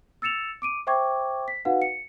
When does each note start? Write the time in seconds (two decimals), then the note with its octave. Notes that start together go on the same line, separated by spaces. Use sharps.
0.22 E6 A6 C#7 E7 F7
0.62 D6 D7 D#7
0.87 C5 E5 G5 C#6 D6 G#6
1.48 B6
1.65 D#4 F#4 B4 F5 F#5
1.82 C#7